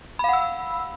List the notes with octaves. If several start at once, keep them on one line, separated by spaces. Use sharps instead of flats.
F5 F#5 B5 E6